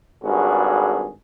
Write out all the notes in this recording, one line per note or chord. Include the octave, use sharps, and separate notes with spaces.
G#1 G2 F#4 G#4